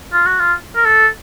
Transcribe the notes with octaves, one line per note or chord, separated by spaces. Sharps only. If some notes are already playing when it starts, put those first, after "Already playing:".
F4
F#4
F4
A#4
A4